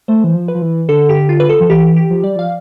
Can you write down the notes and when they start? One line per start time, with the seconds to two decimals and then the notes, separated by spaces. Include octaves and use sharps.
0.08 A3 C5
0.24 E3
0.34 F3
0.48 B4
0.55 F3
0.62 E3
0.88 D3 A4
1.09 G4
1.29 F4
1.40 B4
1.49 A4
1.60 F3
1.69 E3 G4
1.97 G4
2.10 F3
2.23 G3 D5
2.36 F3 F5